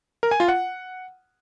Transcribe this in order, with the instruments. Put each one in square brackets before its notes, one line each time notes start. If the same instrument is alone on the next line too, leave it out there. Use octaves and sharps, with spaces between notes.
[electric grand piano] A#4
G#5
F4
F#5